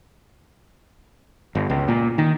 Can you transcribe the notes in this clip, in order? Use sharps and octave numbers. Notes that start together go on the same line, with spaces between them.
G1
C#2
A#2
D#3